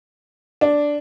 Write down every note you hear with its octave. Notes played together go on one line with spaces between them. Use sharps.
D4